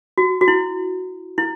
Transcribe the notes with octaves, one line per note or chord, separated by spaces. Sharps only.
F#4
F#4
E4
E4